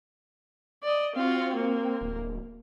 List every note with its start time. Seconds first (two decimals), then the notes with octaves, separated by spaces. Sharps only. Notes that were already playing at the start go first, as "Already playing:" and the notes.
0.83 D5 D#5
1.16 C4 F4 F#4
1.55 A#3
2.01 D1